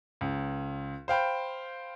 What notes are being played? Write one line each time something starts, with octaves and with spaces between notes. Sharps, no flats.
C#2
C5 F5 G5 B5